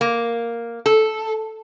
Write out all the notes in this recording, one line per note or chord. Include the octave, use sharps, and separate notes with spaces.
A#3
A4